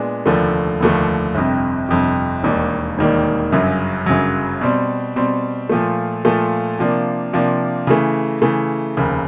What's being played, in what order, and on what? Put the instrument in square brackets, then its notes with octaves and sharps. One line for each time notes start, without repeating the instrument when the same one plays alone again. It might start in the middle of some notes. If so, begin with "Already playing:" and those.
Already playing: [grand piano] A#2 G#3 B3 D4
F1 D#2 D3 F3 A3
F1 D#2 D3 F3 A3
G1 F2 C3
G1 F2 C3
E1 D#2 D#3 G3 A#3
E1 D#2 D#3 G3 A#3
G1 F#2 C#3 F#3
G1 F#2 C#3 F#3
B2 G3 C4
B2 G3 C4
A#2 F3 A3
A#2 F3 A3
C3 F3 A#3 D4
C3 F3 A#3 D4
C#3 E3 A3
C#3 E3 A3
F1 D#2 C#3